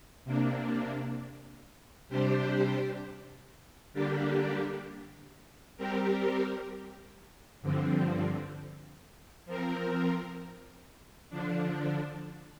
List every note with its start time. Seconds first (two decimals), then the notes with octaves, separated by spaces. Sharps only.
0.25 C3 A#3 D4
2.09 C3 G3 D4 G4 C5
3.93 D3 G3 A#3 D4 G4
5.77 G3 C4 G4 A#4
7.62 G2 D3 F3 C4
9.45 F3 C4 A#4
11.30 D3 F3 D4